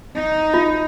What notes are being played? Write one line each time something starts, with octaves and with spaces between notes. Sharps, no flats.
D#4
F4